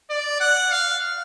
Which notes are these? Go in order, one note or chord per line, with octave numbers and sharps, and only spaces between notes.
D5
F#5
F5